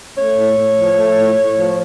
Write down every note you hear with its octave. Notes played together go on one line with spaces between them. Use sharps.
A3 C#5
A2
A2
F3
A3
A2
A2
F3